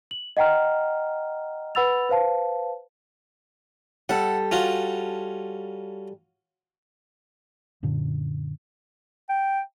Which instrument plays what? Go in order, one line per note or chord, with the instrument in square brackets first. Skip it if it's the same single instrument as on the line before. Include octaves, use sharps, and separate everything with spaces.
[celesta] F#7
D#5 F#5 G5 A#5 F6
B4 F#5 B5 E6 A6 F7
B4 C5 F5 A5
[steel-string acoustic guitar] G3 A4 [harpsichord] F#5
[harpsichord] C#4 F4 F#4
[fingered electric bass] F#2 A#2 D3
[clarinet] G5